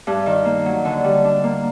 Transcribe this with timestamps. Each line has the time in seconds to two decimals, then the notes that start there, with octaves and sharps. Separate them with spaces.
0.07 G2
0.26 D#3
0.45 A#3
0.66 F#3
0.85 D3
1.04 G3
1.25 D4
1.44 A#3